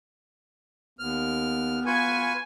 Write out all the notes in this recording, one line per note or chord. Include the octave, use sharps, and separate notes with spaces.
D#2 B3 F6
F4 B4 G#5 C#6